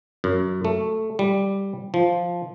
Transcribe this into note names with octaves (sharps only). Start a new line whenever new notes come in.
F#2
A3
G3
F3